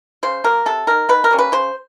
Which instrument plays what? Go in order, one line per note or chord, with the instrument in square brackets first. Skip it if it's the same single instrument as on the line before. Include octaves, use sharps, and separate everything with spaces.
[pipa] C#3 C5
F#3 A#3 A#4
C3 A4
D#3 G3 A#4
D#3 B4
A#4
G3 A#3 C#4
B4
C#3 C5